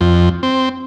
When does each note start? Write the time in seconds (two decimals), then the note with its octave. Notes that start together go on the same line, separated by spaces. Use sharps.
0.01 F2
0.43 C4